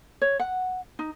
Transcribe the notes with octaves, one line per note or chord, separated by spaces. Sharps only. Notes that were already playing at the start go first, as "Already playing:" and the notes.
C#5
F#5
D#4